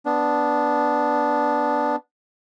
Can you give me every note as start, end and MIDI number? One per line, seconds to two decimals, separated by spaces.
0.06 1.96 59
0.06 1.96 62